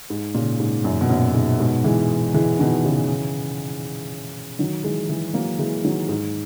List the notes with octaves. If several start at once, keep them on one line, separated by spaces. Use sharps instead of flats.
G#2
A#2 C#3
G#2
F#2 A#2
B2
F#2 A#2
G#2 B2
G#2 B2
E3 G#3
E3 G#3
B2 D#3
C#3 E3
D#3 F#3
E3 G#3
E3 G#3
F#3 A#3
E3 G#3
D#3 F#3
G#2